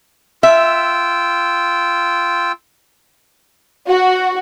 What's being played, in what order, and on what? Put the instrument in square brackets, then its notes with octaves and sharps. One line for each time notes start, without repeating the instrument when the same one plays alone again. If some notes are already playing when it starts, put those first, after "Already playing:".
[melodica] F4 G5 E6 [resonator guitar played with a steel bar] E5
[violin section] F#4